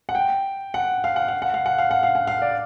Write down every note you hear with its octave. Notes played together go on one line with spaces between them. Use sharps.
F#5
G5
F#5
F5
F#5
F5
F#5
F5
F#5
F5
F#5
F5
F#5
F5
D5